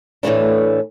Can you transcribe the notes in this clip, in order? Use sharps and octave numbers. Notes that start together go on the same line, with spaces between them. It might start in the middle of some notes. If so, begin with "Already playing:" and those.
A2 E3 A3 D4 B4